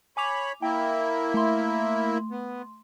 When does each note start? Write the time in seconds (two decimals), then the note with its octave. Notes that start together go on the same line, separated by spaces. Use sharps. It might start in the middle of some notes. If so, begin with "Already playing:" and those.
0.17 C#5 G#5 B5 D6 F7
0.62 A#3 E4 G5
1.34 A3 C6
2.31 B3